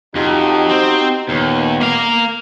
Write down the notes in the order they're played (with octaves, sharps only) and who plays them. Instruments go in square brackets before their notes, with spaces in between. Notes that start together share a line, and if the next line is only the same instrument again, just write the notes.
[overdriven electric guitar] F2 [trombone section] D#4 F#4 G4
[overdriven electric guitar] C4
[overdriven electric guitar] D#2 [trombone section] A#2 B3
[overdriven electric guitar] A#3 F5